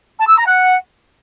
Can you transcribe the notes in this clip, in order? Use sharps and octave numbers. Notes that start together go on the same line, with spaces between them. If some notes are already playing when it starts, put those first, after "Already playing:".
A5
E6
A#5
F#5